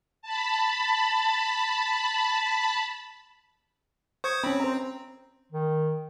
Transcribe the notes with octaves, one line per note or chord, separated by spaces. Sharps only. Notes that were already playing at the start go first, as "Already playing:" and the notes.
A5 B5
C5 C#6 D#6 G#6
C4 C#4 B5
C5 A#5
D#3